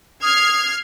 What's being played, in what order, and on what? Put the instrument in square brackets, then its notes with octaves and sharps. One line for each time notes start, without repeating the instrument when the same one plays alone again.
[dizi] D#6 [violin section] F6 G#6 C7